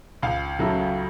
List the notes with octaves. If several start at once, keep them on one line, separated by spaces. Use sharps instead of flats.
C#2 F5
C#3 F#3 A3